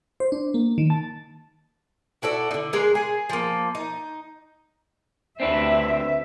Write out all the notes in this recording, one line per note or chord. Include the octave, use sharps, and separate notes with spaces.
C5
D4
A#3
D#3
A5
E4 F#4 A4 D5
D3 D#4
G#3 G#4 A#4
G#4
F3 A#3
D#4
D2 C4 D4 B4 E5